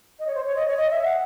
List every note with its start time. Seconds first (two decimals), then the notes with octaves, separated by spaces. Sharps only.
0.19 D#5
0.27 C#5
0.35 C5
0.45 C#5
0.56 D#5
0.67 C#5
0.77 D#5
0.91 E5
1.05 F#5